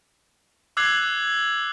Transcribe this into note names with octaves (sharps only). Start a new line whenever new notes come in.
D6 E6 F#6 G#6 C7 F#7